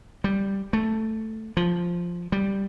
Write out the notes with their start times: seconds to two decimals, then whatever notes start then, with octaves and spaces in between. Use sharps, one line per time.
0.24 G3
0.73 A3
1.57 F3
2.32 G3